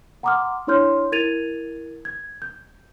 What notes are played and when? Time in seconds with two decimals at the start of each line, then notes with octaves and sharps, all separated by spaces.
0.23 F#5 A#5 C6 D6 D#6 F6
0.67 D4 E4 C#5 C6 F6 G6
1.12 E4 A#4 G#6 A6 D#7 F7
2.05 G#6
2.42 G6